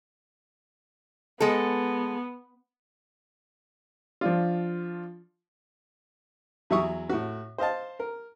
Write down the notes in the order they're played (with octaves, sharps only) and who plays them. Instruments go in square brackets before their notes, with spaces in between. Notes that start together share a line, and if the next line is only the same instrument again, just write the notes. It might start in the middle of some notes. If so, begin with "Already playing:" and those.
[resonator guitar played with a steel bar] G#3 A4 [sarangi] B3
[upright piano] F3 D4 F4
[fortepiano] E2 F#3 E4 E5 C#6 D#6
A2 F#4
C5 D#5 F5 A5
A#4